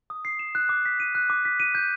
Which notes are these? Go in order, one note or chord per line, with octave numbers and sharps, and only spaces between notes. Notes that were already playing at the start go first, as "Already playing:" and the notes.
D#6
C7
E7
F#6
D6
B6
D#7
F#6
D6
B6
D#7
G6